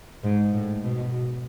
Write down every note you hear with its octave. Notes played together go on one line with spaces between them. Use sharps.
G#2
A2
B2